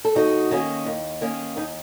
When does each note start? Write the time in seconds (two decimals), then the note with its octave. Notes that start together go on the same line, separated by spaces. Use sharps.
0.05 A4
0.15 D#2 D#4 F#4
0.51 D#3 A#3 C#4
0.86 D#2
1.21 D#3 A#3 C#4
1.57 D#2 D#4